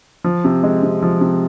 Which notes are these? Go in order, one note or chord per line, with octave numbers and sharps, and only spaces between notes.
F3
C3
G#3
C3
F3
C3